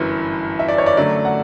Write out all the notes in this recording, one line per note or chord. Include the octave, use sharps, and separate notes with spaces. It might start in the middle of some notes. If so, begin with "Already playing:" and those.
Already playing: G1 F#2 E3
E5
D5
C#5
D5
F#2 D3 F#3 A3 D5
F#5